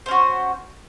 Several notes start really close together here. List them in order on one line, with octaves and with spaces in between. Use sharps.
C5 C#4 F#4